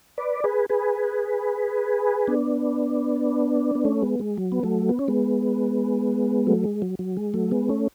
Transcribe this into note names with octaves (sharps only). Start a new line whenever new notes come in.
B4 D5
G#4 B4
G#4 B4
B3 D4
B3
A3 C#4
G#3 B3
G#3
F#3
B3
F#3 A3
B3
C#4
G#3 B3
F#3 A3
G#3
F#3
F#3
G#3
F#3 A3
G#3 B3
A3 C#4